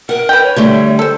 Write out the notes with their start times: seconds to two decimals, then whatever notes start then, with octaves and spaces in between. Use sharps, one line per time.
0.09 A#4 F#5
0.29 B4 G5
0.43 C#5
0.56 D3 G3 A3
0.99 A4 C5